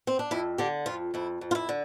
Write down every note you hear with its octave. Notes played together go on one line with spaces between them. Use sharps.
C4
D4
F2 E4
D3 G4
F2 F4
F2 E4
F2
F4
E4
D3